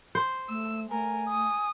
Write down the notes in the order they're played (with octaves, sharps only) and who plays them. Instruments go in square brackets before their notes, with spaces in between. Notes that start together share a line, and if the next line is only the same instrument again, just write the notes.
[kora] C5
[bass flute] A3 [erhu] E6
[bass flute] A3 [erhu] A#4 [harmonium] G#5
[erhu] D#6